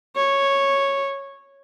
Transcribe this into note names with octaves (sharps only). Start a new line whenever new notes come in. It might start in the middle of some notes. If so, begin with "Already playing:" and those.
C#5